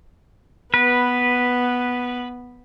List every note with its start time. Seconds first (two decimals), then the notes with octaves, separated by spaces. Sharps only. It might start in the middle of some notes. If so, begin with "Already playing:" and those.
0.74 B3 B4